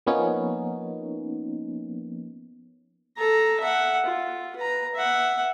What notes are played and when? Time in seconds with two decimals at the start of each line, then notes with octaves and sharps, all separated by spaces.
0.07 F3 A#3 B3 C#4 D#4
3.18 A4 A#5
3.60 E5 F#5
4.05 F4
4.56 B4 A#5
4.95 E5 F#5